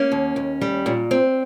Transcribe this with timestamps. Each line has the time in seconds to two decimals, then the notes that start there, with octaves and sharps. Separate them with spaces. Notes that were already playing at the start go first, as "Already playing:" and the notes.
Already playing: A#3 C#4
0.12 D#2
0.36 D#2
0.61 G3
0.86 A#2
1.11 C4